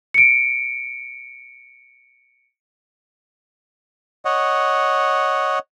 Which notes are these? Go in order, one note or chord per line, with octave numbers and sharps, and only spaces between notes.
C#7 D7
C#5 D#5 F#5